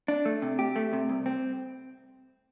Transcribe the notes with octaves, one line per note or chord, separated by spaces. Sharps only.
D4
A3
C3
G4
A3
C3
C2
C4